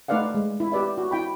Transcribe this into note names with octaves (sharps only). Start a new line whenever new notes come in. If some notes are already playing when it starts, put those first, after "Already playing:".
A3 D#4 B4 D5 F5 F#5
G#3
E4
G4 B4 D5 E5
F#4
E4 G5 B5